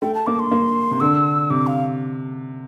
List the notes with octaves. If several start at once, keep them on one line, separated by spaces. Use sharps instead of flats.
A3 G5
A5
A#3 D6
C6
A#3
C3
D3 E6
C3 D6
F5